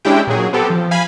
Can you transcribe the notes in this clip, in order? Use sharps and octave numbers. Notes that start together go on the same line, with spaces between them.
G#3 C#4 D4 E4 G4 G5
A#2 F#3 G#4
B3 C4 G4 A4
F3
F5 G#5 B5